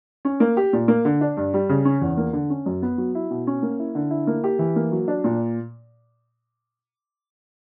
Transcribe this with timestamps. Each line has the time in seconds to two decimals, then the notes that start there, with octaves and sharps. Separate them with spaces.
0.25 C#4
0.40 A#3
0.57 G4
0.73 A#2
0.88 A#3
1.05 D3
1.21 D4
1.37 G2
1.54 G3
1.69 C#3
1.85 C#4
2.01 E2
2.17 A#3
2.33 D3
2.50 C#4
2.66 F#2
2.82 B3
2.98 F#3
3.15 E4
3.31 B2
3.47 C#4
3.62 A#3
3.79 E4
3.95 D3
4.10 E4
4.27 A#3
4.44 G4
4.59 E3
4.76 A#3
4.92 F#3
5.08 D4
5.24 A#2